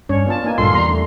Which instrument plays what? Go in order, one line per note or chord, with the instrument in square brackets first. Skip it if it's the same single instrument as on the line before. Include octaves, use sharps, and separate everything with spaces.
[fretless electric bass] G2 [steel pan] C#4 D4 C#5
[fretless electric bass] B3 [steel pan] D4 F4 A5
[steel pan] A#3 D#4 G#5
[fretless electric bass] D2 G2 A#2 [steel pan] F4 A4 [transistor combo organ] C6
[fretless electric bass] E2 [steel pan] G3 A#5
[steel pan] A3 D4